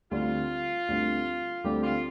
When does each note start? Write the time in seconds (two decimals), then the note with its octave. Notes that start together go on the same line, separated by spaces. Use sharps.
0.11 D2 D3 G3 C4 F4
0.88 D2 D3 G3 C4
1.64 D2 D3 G3 C4 G4
1.83 F4